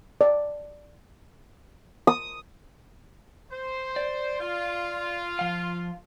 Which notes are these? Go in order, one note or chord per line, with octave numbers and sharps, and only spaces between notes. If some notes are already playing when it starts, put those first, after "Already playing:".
D5
D#6
C5
D5
F4
F3 F5